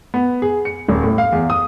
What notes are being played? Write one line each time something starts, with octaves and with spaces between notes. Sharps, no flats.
B3
G#4
C#7
D#1
A2
F5
E2
D#6